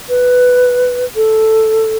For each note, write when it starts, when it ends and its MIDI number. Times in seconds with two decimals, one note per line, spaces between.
0.09 1.05 71
1.16 1.97 69